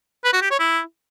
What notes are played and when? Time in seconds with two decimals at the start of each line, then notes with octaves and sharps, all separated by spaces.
0.24 B4
0.33 F#4
0.42 G4
0.51 C#5
0.60 E4